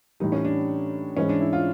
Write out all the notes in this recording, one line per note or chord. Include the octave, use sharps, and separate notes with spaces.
A2 E3 G3 D#4
C#4
D4
G#2 E3 G#3 C#4
D4
E4
F4